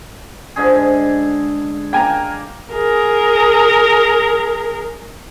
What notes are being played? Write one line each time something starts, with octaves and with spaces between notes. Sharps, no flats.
G#2 D3 G#4
A#3 G5 G#5 A#5
G#4 A#4